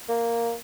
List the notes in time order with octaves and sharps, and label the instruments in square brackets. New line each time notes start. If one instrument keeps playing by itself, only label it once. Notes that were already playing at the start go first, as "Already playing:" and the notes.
[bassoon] A#3